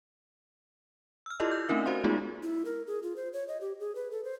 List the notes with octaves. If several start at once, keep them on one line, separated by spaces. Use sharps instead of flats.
E6 F6
E4 F4 G4 A4 D5 D#5
G6
A3 C4 C#4 D#4 A#4 E5
F#4 C5 F5 C6
G#3 A3 B3 D#4 F4 G#4
E4
A#4
G#4
F4
C5
C#5
D#5
G4
G#4
B4
A4
C5